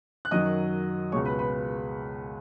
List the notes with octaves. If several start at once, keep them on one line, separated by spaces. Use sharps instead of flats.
F#6
F#2 D#3 F#3 D#5 D#6
C#2 B2 G#3 C#5 C#6
B4 B5
B4 B5